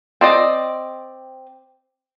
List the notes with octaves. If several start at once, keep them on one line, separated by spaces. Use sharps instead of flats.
C4 D5 D#5